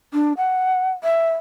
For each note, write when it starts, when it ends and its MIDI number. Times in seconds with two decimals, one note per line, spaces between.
0.14 0.33 62
0.37 0.89 78
1.04 1.34 76